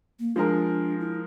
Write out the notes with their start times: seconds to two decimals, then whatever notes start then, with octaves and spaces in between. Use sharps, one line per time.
0.19 A#3
0.36 F3 G#3 D4 A#4
1.00 E4